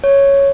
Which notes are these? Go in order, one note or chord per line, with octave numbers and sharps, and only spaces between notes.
C#5